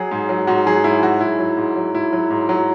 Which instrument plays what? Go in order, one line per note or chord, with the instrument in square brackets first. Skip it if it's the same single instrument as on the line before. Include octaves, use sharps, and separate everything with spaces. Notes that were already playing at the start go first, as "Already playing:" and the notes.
Already playing: [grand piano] F#3 G#4
G#2
F#3
G#2 F#4
F#3 G#4
G#2 E4
F#3 F#4
G#2 E4
F#3
G#2
F#3
G#2 E4
F#3
G#2
F#3